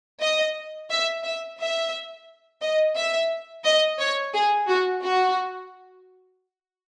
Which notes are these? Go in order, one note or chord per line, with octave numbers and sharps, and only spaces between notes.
D#5
E5
E5
E5
D#5
E5
D#5
C#5
G#4
F#4
F#4